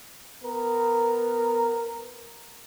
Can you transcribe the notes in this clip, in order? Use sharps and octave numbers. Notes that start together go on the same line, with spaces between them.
B3 A#4